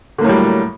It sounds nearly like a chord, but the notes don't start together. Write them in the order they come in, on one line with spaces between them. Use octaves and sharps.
D3 A#3 A2 F#3 G3